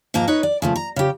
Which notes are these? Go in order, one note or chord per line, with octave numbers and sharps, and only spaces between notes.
G#2 F3 A#3 A#4 A#5
D#4 B4 C#5
D5
C#3 F3 A3
A#5
C#3 G4